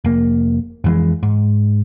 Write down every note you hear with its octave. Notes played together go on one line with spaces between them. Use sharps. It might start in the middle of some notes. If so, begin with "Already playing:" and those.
F1 A#3
F2 E3 G#3
G#2